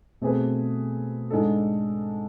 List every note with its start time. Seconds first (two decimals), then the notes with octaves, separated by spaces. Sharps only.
0.21 B2 A3 C4 G#4 B4
1.30 G#2 G#3 D4 A4